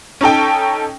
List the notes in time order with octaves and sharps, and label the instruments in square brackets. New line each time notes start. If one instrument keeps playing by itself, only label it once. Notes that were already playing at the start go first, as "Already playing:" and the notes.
[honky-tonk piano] C#4 D#4 A4 G5